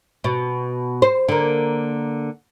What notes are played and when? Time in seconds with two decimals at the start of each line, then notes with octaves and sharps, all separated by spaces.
0.24 B2
1.02 C5
1.29 D3 A#3